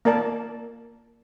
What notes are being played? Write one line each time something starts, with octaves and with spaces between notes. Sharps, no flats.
A#3 A#4 D5 A5